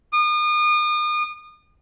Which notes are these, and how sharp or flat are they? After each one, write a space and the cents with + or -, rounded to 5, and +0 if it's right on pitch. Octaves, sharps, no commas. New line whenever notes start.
D#6 -40